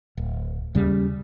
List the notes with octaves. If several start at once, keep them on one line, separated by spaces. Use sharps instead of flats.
D1
D#2 C#3 G3